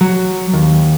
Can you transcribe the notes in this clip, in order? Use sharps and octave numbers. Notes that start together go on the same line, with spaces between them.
F#3
D#2